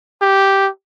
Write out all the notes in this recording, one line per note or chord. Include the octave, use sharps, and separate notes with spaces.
G4